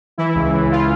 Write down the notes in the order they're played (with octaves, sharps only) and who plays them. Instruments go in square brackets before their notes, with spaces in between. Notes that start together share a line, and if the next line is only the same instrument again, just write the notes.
[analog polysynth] E3 E4
C#2
E3
F4